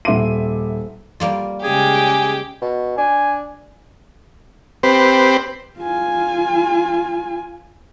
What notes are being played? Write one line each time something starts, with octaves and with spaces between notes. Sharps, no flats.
D#1 E5 C6 D6 D#7
G3 A#3 F4
C#3 G#3 C#4 G4 G#4 G#5
B2
D4 G#5
C4 G4 B4 C5
F4 G#5